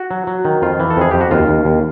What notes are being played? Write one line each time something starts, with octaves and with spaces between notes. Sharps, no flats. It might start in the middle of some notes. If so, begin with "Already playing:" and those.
Already playing: F#4
F#3
F#3
D#3
F2 F4
E3
A4
F2 G#4
F2 G4
F#4
D#2 F4
D#2
D#2